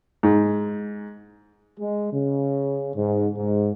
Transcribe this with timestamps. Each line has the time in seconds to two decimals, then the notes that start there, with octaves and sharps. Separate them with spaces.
0.23 G#2
1.79 G#3
2.12 C#3
2.95 G#2
3.35 G#2